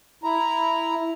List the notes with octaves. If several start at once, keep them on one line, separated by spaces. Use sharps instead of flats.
E4 A#5